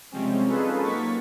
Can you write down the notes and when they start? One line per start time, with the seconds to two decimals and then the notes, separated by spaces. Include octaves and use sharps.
0.11 C3 F3 G3 G#3 C4 C#4
0.44 C#4 D#4 F4 G#4 A4 B4
0.82 F#3 A#3 C#6 A6 B6